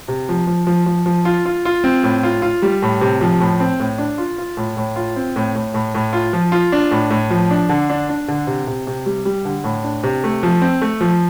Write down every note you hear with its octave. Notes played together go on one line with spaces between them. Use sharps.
C3
F3
F3
F3
F3
F3
F4
F4
F4
C4
A2
F4
F4
G3
A2
C3
F3
A2
C4
A2
D4
F4
F4
A2
A2
F4
C4
A2
A2
A2
A2
F4
F3
F4
D4
A2
A2
F3
D4
D3
D4
D4
D3
C3
C3
C3
G3
G3
D3
A2
D4
C3
A3
F3
C4
A3
F3